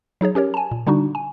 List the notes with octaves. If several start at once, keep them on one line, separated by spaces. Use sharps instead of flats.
F#3 D#4 G#4 C#5
C#4 G4 A#4 C#5
G#5 A5
A#2
D3 G3 D4 D#4 F#4
G#5